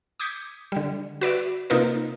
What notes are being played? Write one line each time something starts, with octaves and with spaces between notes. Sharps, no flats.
D6 D#6 G6 G#6 B6 C#7
D3 G3
F#4 B4 D5 E5
C3 A#3 D#4 F4 A#4 B4